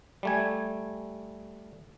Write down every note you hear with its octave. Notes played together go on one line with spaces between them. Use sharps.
G3 A3 G#5